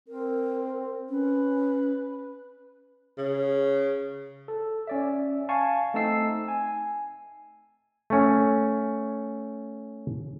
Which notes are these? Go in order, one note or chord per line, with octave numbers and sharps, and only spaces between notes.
C4 A#4
C#4 B4
C#3
A4
C#4 D5 E5
F5 G#5 A5 C#6
A3 C4 D#4 A5 E6 C7
G#5
A3 C#4